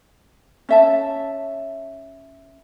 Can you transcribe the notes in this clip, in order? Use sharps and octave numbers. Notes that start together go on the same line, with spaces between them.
C#4 E5 A5